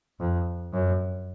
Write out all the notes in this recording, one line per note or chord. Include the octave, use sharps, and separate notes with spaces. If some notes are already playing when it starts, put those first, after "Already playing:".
F2
F#2